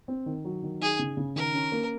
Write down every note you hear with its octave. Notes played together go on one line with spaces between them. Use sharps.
C4
D#3
F#3
D#3
D#4 G#4
C#3
C#3
D#3 A#4
C#4
A#3